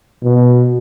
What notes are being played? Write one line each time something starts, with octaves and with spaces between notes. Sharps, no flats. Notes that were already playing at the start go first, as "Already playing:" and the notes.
B2